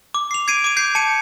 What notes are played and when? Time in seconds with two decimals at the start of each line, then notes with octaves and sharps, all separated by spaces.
0.14 D6
0.31 C7 F7
0.48 G#6 C7 D7 D#7
0.64 D6 D#7
0.77 G6 G#6 C7
0.95 A5 C#7 D#7